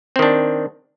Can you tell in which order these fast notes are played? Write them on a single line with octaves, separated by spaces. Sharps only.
C4 D#3 D4